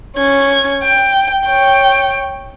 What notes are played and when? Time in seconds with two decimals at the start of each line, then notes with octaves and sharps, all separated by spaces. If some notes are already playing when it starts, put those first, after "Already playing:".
0.16 C#4 G#6
0.83 G5
1.45 C#5 G5